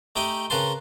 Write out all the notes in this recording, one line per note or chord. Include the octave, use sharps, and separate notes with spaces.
A3 D#4 G4 G5 G#5
C#3 A#4 B4 A5 C6